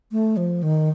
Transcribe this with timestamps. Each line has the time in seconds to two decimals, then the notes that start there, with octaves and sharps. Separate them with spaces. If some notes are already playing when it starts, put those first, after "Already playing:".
0.12 A3
0.37 F3
0.63 D#3